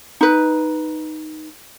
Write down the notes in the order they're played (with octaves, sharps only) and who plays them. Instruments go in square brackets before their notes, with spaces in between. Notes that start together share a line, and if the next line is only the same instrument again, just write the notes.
[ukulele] D#4 B4